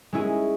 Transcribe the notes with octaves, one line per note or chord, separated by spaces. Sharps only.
G#3 C#4 E4 G#4